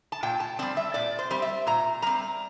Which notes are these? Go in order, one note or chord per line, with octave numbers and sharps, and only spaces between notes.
A5
A#2 G5
A5
G3 C4 D5
E5
A#2 D5
C5
G3 C4
E5
A#2 A#5
G3 C4 A#5